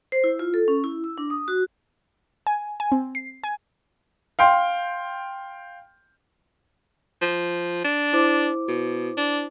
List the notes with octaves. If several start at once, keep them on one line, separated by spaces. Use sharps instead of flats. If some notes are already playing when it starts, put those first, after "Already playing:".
C5
E4
F4
A4
C#4
E4
E6
D4
D#6
F#4
G#5
G#5
C4
C7
G#5
F5 G5 C6
F3
D4
E4 C5 D6
B2
D4